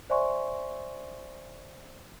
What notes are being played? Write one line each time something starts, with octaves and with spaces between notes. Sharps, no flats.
C5 D5 E5 G#5 C6 C#6